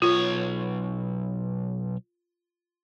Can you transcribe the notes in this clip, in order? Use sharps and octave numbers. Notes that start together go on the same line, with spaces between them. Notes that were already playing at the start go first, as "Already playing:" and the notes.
B1 F4 C#5